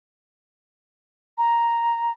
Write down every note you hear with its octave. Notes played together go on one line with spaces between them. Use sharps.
A#5